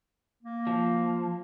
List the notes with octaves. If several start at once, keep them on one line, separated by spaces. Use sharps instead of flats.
A#3
F3